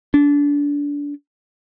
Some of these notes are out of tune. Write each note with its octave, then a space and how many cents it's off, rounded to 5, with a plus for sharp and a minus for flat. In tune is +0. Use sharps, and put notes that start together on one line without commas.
D4 -25